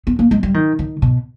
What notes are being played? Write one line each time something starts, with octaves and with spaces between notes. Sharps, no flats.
B3
A#3
G#3
G3
D#3
D#3
B2